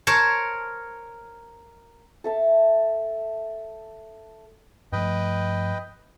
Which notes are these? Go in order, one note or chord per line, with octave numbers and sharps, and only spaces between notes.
A#4 C5 C#5 A5
A4 E5 A5
G2 F3 A3 B4 D#5 G5